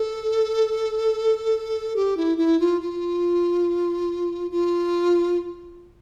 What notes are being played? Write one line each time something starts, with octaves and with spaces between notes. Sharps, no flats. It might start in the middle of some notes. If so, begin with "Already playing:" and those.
Already playing: A4
G4
E4
E4
F4
F4
F4